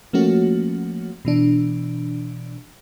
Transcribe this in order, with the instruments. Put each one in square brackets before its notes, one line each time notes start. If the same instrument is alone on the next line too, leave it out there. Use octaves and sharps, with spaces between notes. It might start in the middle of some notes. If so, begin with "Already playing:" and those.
[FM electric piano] F3 A3 A#3 C#4 F#4
B2 E3 D4